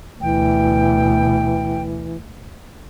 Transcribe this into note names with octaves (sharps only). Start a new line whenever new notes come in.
D2 B2 E3 G5